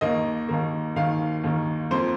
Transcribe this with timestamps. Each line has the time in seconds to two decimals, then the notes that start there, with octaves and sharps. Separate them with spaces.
0.01 D#2 D#3 A#3 D#5
0.49 D#2 D#3 A#3
0.96 D#2 D#3 A#3 F5
1.43 D#2 D#3 A#3
1.91 F2 F3 A#3 C5